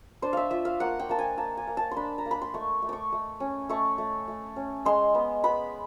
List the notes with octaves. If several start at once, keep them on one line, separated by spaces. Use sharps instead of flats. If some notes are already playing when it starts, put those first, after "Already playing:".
D4 C5
E5 F5
F4 E5
F5
A#3 F#5
G5
A#3 A5
G#5
A#3 A5
G#5
A#3
A5
C6
D4 B5
A#5
A#3
B5
C6
A3 C#6
A3
C#6 D6
A3
C#4
A3 C#6
A3
A3
C#4
G#3 C6
B3
B3 B5